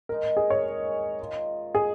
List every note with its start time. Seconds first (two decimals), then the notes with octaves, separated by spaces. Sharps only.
0.09 D#3 G#3 D#4 A#4
0.37 G#4
0.50 C#5
1.19 D#3 G#3 F4
1.75 G#4